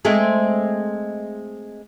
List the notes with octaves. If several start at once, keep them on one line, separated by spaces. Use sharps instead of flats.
G#3 A3 C4